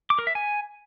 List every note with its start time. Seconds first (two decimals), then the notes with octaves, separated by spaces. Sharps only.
0.10 D6
0.19 A#4
0.27 E5
0.35 G#5